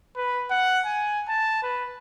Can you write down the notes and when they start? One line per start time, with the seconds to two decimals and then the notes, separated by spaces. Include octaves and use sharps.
0.16 B4
0.51 F#5
0.85 G#5
1.28 A5
1.63 B4